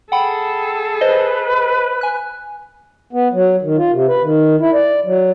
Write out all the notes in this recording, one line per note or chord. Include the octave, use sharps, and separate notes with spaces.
G#4 A4 F#5 G5 B5
B4 C5 D#5
G#5 F#6
B3
F#3
D#3
F4
C3
B4
D#3
E4
D5
F#3